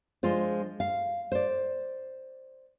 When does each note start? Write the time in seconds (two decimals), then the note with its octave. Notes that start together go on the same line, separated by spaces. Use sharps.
0.23 F3 G#3 D4 F4 C5
0.80 F5
1.32 C5 D5